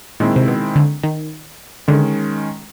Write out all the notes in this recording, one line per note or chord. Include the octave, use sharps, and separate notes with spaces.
A#2 D#3 G#3 C4 E4
C3
B2
D3
D#3
D3 D#3 G#3 C#4